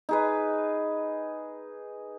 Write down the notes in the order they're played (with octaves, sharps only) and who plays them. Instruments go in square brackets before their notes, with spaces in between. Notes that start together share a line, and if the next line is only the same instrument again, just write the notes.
[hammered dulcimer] D#4 G#4 B4